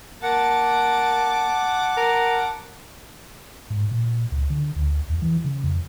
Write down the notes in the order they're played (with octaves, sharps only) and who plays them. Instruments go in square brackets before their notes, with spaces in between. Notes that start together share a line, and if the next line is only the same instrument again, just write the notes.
[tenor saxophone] A#3 [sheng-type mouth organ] F#5 [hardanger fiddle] A5 D6
[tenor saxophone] A#4
[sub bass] G#2
A#2
C#2
D3
D2
E2
E3
C#3
F2